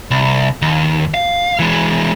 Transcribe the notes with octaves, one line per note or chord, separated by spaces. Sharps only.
C2
D#2
F5
E3 G#3